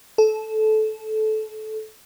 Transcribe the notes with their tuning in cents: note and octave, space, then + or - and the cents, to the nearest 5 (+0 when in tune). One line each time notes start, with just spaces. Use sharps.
A4 -20